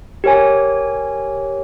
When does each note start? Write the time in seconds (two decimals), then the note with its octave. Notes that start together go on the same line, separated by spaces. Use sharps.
0.24 G4 A#4 C#5 G#5